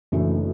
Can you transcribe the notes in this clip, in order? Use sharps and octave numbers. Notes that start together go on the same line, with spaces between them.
F#1 F#2 E3 A3 D4